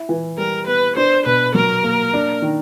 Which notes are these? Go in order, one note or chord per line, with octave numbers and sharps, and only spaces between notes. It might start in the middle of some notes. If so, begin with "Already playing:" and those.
Already playing: E4
E3
G3 A#4
B3 B4
D4 C5
B2 B4
F#3 A#4
A#3
D4
D#3